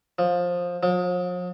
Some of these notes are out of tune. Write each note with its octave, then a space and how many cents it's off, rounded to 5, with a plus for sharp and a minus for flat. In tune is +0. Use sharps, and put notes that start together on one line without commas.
F3 +15
F3 +45